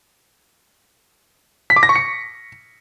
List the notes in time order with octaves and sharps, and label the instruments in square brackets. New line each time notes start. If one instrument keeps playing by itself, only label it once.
[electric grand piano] B6
D6
A#6
C#6
C#7